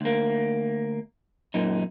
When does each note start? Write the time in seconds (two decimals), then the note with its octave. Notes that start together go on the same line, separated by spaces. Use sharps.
0.01 D2 A#3
1.54 F#2 A#2 D#4